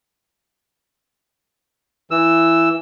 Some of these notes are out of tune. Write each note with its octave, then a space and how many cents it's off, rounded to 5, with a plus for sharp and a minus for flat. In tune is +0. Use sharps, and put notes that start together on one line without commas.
E3 +10 E6 +0